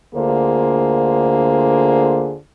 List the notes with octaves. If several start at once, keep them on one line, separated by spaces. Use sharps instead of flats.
D2 D3 A#3 F4 G#4 C5